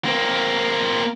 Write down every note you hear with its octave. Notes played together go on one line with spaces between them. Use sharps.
A#3 C4